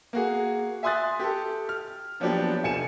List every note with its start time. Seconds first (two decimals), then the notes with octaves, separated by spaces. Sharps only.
0.13 A#3 F#4 G#4
0.83 E5 G#5 C6 D#6 F#6 A6
1.20 G4 A4
1.69 F6
2.20 A#2 F3 F#3 B3 D4 G4
2.64 F1 G#5 C#7 E7